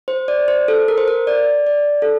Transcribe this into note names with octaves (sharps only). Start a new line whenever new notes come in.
C5
D5
C5
A4
A#4
C5
A#4
D5
D5
A4